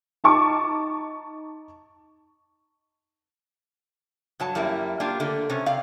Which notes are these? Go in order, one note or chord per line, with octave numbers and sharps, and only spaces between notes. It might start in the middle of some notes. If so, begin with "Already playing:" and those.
D#4 A5 C#6 D6
G2 F#3 A5
F#2 G3 A#3 E4
A#3 D4 F4 G4
D3 A3 A#3
C3 C#4
C4 D5 F5